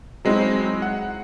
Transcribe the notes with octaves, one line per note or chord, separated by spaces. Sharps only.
F#3 G#3 C4 D#4 E4
F#5